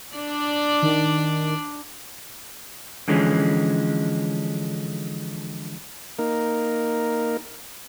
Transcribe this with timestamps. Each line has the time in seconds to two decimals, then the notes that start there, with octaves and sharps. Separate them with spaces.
0.15 D4 D5
0.82 D#3
3.08 D3 E3 F3 G#3 C#4
6.19 A#3 D#4 A#4